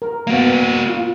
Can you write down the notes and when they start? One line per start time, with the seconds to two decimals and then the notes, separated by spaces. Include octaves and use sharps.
0.02 A#4
0.27 A#3 B3 F#4 F5
0.89 F4